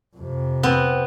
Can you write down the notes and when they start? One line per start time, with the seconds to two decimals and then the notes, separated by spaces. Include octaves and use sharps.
0.17 F2 C3
0.63 B3 C4